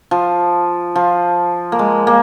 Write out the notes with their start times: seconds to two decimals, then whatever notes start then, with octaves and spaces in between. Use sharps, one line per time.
0.11 F3
0.95 F3
1.72 A#3
1.79 G#3
2.07 A#3